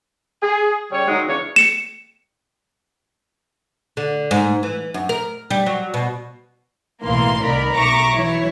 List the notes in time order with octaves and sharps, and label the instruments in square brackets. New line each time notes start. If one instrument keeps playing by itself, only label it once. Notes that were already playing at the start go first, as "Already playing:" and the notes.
[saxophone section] G#4
C#3 G3 C#5
D#3 F#3 G#3 D#4
E2 C#3 D4 C#5
[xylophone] C#7 E7
[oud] D3
G#2
E3
F#2
A#4
G3
F#3
B2
[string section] B1 A2 E3 A#3 F5 C6
C2 D#3 A#4 D5 B5
B1 E5 A#5 C#6 D6 A#6
E3 F#3 E4 C#5